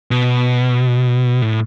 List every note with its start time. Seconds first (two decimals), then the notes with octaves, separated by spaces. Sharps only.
0.11 B2
1.42 A2